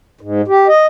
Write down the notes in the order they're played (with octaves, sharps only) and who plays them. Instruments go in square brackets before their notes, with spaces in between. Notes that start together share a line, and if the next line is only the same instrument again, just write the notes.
[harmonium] G#2
G4
D#5